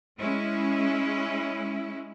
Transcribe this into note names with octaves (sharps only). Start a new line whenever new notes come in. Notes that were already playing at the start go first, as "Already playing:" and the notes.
G#3 C#4 E4